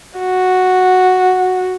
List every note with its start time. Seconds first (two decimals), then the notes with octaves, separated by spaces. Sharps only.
0.19 F#4